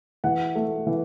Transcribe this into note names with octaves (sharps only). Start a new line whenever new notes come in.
E3 F#5
A3
E3